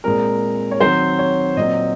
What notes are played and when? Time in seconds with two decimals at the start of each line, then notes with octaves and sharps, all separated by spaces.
0.04 A#2 G#3 C4 A#4
0.71 C#5
0.81 D#3 F#3 C4 C5
1.19 C#5
1.57 A#2 F#3 C4 D#5